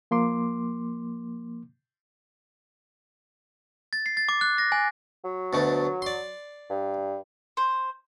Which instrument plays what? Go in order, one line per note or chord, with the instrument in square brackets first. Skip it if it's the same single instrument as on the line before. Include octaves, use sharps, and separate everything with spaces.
[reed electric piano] F3 A#3 C6 D6
[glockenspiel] A6
C7
A6
D6
F#6
A#6
G#5
[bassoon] F#3
[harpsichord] D2 B2 A3
D5 C6
[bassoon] G2
[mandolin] C5